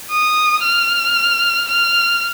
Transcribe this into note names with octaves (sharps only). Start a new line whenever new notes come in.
D#6
F6
F6